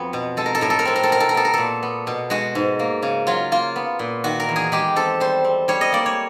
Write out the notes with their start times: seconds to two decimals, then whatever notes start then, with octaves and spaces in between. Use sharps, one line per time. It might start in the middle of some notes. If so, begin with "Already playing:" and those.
Already playing: F2 F#3 B3
0.13 B2
0.37 G#3 A4
0.46 A#4
0.55 A4
0.61 A2 A#4
0.70 A4
0.79 A#4
0.85 C4 A4
0.96 A#4
1.03 A4
1.09 B2 A#4
1.20 A4
1.29 A#4
1.34 B3 A4
1.45 A#4
1.54 A#2 A4
1.83 B3
2.07 B2
2.30 G#3 F#4
2.55 G#2
2.79 A#3
3.03 C#3
3.27 F#3 F4
3.52 A#3 F4
3.76 B3
3.99 A#2
4.24 D#3 F#4
4.40 A#4
4.49 E2
4.56 G#4
4.72 G#3 G4
4.96 C4 A4
5.20 G3 C5
5.44 C4
5.68 G3 C#5
5.81 D#5
5.92 A#3 D5
6.06 C#5